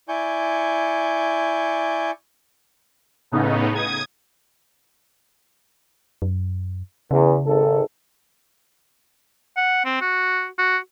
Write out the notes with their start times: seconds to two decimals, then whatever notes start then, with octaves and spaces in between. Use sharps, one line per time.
0.08 E4 D5 G#5 C#6 G6
3.31 A2 C#3 B3 D#4
3.75 D#6 G#6
6.22 F#2
7.11 E2 C#3
7.46 G#1 A4
9.57 F#5
9.85 C4
10.01 F#4
10.59 F#4